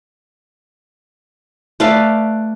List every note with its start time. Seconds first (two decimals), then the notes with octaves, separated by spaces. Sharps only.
1.80 A3 B4 D5 F5